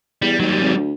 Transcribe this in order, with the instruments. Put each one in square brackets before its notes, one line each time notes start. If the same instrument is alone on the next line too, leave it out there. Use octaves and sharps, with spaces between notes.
[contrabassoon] E2 [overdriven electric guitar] G3
[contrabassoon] D#2 [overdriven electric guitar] F#3 G3
[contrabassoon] G#1
D2